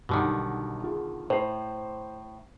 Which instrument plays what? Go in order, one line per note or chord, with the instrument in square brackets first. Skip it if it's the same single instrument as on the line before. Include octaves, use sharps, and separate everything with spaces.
[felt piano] B1 F#3 G3 [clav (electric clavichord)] B2 D3 D#3
[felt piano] F4 G#4
[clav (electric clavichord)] A2 [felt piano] C5 C7